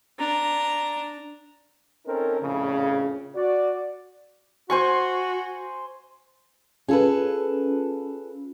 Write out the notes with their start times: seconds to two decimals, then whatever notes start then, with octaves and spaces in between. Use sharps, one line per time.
0.19 D4 A#5
2.06 C4 C#4 D#4 A4 A#4
2.40 A#1 F2 A2 C#3
3.35 F#4 D5
4.70 F#4 C5 G#5 C#6
6.88 C#4 F4 G#4 A4 B4